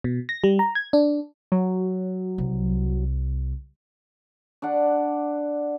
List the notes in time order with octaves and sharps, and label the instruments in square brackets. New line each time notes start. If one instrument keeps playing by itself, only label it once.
[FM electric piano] B2
A#6
G3
A#5
G#6
D4
[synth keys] F#3
[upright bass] C2
[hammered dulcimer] D4 D5 F#5